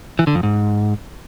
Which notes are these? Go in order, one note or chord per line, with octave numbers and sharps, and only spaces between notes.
E3
D3
F2
G#2